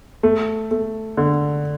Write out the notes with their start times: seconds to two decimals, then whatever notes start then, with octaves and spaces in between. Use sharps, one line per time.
0.23 A3
0.71 A3
1.17 D3